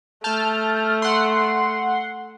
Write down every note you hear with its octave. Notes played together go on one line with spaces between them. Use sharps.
A3 A5 F6 G6
F#5 C6